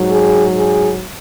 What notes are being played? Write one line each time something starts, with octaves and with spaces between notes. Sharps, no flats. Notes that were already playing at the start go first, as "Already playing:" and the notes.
Already playing: G#2 F#3
G#4
G#4